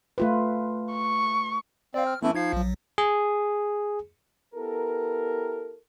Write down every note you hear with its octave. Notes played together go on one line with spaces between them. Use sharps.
A3 F4 B4
C#6
C4 D5 F5
F6
E3 A3 B3 C#4 E4
F3 D#4 G#6 C7
A#1 F#3
G#4
B3 E4 G4 A4 A#4